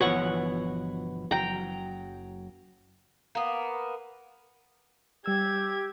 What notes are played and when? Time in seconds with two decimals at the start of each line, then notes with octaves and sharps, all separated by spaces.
0.01 G1 B2 E3 F3 B3 C#5 F#5 C#6
1.31 F#1 F#3 G5 A#5
3.35 A#3 B3
5.26 G3 G4 E6 G#6